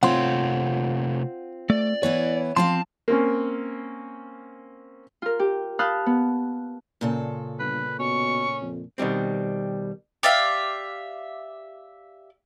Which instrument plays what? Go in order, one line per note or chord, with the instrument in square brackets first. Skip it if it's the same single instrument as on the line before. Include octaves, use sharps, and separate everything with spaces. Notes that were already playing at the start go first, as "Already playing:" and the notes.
[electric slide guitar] C3 A3 C#5 [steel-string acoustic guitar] C4 F4 [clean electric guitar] F#5 C6
[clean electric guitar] A3 [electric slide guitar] D5
[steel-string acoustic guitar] E3 B3 E4 [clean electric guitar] C#5
[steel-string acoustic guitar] F3 C4 F5 [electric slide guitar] A5 [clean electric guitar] C6
[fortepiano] A#3 C4 C#4
[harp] F4 A#4
G4
F5 A5 B5 D#6 F#6 G6
B3
[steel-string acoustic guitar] A#2 C#3 A4
[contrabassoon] G1 [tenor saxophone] B4
[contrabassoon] B2 [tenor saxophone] C#4 [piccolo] C#6
[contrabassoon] F2
[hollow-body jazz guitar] B2 D#3 G3 C4
[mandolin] G4 D5 E5 F5